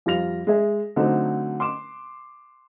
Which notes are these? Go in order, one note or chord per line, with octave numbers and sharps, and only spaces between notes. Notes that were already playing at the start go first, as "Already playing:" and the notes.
F2 G3 F4 A#6 F7
G#3 G#4 E5
D3 F#3 A3 C4 D#4
C6 D6 E7